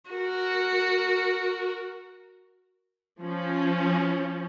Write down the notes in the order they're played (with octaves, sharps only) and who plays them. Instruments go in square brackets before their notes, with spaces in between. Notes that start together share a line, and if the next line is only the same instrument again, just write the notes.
[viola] F#4 A#4
[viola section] F3 C#4